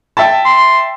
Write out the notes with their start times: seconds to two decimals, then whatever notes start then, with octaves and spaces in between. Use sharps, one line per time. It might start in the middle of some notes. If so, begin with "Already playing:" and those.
0.17 E5 G5 A5
0.45 C6